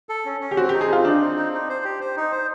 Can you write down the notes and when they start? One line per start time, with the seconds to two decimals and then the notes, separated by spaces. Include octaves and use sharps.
0.09 A4
0.25 C#4
0.41 C#4
0.51 G4
0.57 C4 F#4
0.69 D#4 G4
0.81 G#4
0.89 C4 F4
1.05 D4 D#4
1.21 C4
1.36 D#4
1.53 D#4
1.69 C5
1.84 G4
2.01 C5
2.17 D#4
2.32 C5